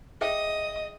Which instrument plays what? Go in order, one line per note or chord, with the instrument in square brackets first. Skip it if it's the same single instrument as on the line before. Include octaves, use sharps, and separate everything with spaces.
[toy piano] G#4 E5 G5 [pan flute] D#5 [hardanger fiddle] D#6